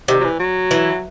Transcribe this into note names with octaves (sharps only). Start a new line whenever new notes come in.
C3 D#3
F#3
E3
F#3
E3